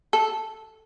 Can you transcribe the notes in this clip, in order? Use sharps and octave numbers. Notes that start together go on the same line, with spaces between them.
A4